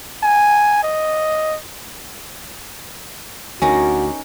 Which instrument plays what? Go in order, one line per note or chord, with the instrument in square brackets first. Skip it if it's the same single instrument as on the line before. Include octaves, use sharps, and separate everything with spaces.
[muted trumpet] G#5
D#5
[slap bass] D2 [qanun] C#4 D#4 A#4 [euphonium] F#4 [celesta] G#5